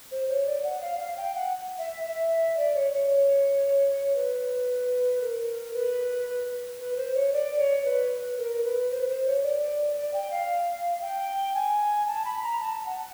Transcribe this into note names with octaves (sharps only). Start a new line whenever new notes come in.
C5
C#5
D5
F#5
F5
F5
G5
F#5
E5
E5
D5
C#5
C#5
B4
A#4
B4
B4
C5
C#5
D5
C#5
B4
A#4
B4
C5
B4
C5
C#5
D5
D5
G5
F5
G5
G#5
A5
B5
A#5
A5
F#5